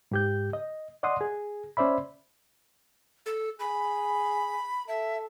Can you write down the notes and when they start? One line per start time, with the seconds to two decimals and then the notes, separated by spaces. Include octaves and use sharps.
0.12 G#2 G4 G6
0.53 D#5
1.03 D5 D#5 F#5 C6 D#6
1.21 G#4
1.77 C#4 C5 D5 E5 B5
3.26 A4
3.60 G#4 B5
4.88 A4 E5